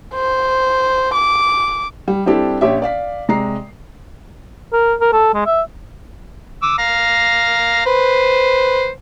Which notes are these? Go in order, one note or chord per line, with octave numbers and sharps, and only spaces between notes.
C5
D6
G3
G3 C4 D4 E4 G4 A4
A#1 C#4 G4 C#5 E5
D5 F5 B6
C3 G#3 D5 A#5 C7
A#4
A#4
A4
G#3
E5
D6 E6
F5 A#5
B4 C5